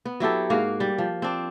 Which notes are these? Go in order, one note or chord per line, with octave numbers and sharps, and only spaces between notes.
B3
F#3 E4 G4 A4
G#2 A#3 F#4 F5
G3
F3
C4 D4